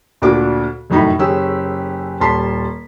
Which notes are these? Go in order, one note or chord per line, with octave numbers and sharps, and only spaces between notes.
D2 A#2 D4 F#4 D6
F1 F#2 A2 D#4 A#5 B5
F#1 C#4 G4 G#4 E6
D#1 G3 A5 C6 B6